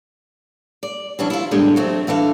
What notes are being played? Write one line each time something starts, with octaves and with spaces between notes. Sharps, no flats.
D5
E3 F#3 C#4 D4
E4 F4
E2 A2 D3 G3 G#3 G4
F#3 A3 C4
D3 E3 A4 F5